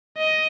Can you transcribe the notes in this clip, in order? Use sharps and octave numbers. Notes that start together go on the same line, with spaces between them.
D#5